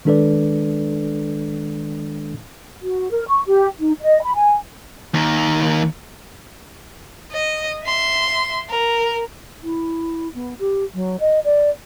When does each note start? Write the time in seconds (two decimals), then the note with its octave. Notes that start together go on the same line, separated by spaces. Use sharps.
0.05 D#3 G#3 D4 A4 B4 D5
2.82 F#4
3.11 A#4
3.28 C#6
3.46 G4
3.79 D#4
4.01 D#5
4.22 B5
4.35 G#5
5.14 D#2 D#3
7.32 D#5
7.85 E5 C6
8.70 A#4
9.63 E4
10.34 B3
10.59 G4
10.94 F#3
11.20 D#5
11.44 D5